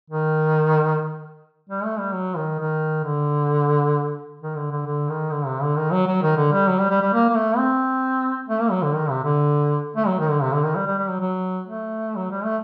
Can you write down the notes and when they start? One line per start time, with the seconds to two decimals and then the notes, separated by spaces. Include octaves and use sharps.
0.10 D#3
1.69 G3
1.84 A3
1.99 G3
2.14 F#3
2.36 D#3
2.59 D#3
3.04 D3
4.41 D#3
4.57 D3
4.71 D3
4.86 D3
5.09 D#3
5.31 D3
5.46 C3
5.62 D3
5.76 D#3
5.91 F#3
6.06 F#3
6.22 D#3
6.37 D3
6.52 G3
6.68 F#3
6.79 G3
6.90 G3
7.02 G3
7.13 A#3
7.29 A#3
7.35 A3
7.58 C4
8.49 A3
8.61 A#3
8.71 F#3
8.82 D3
8.94 D#3
9.10 C3
9.24 D3
9.97 A3
10.07 F#3
10.19 D#3
10.30 D3
10.42 C3
10.53 D3
10.64 D#3
10.76 G3
10.86 G3
10.98 G3
11.09 F#3
11.21 F#3
11.67 A3
12.17 F#3
12.31 G3
12.44 A3